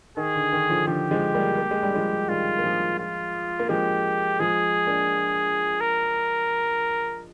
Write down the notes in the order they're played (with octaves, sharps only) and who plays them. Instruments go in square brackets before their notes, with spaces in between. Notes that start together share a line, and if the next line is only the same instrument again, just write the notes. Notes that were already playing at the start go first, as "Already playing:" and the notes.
[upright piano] D#3 [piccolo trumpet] G#4
[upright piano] D3
D#3
D3 F3
[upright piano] D3 F3 [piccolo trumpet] G4
[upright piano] F3 G#3
G3 A#3
A#3
G#3
G3
F3 G#3
[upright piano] D#3 G3 [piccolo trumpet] F4
[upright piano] A#3
F3 G#3
[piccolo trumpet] F4
[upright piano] A#3
[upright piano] F3 G#3 [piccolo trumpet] G4
[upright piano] F3 G#3 [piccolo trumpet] G#4
[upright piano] A#3 D4
[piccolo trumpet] A#4